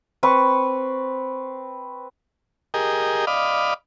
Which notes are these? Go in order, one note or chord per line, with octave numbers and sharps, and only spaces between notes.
C4 B4 C#6
G4 G#4 A#4 D#5
D5 D#5 F5 B5